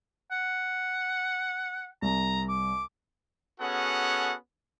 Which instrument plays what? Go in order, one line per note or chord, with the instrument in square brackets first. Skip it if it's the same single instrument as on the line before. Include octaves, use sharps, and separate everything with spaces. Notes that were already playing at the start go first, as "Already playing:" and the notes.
[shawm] F#5
[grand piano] C2 [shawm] A#5
[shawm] D6
[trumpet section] B3 C#4 F#4 G#4 A4 F#5